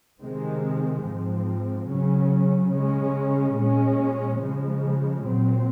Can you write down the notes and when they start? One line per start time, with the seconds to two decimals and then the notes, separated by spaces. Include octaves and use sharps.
0.20 C3 D#3 G#3 C4
1.04 G#2 F3 C4
1.88 C#3 F#3 C#4
2.71 C#3 G#3 C#4
3.55 A#2 G#3 C#4
4.39 C#3 F3 G#3
5.23 A#2 F#3 C4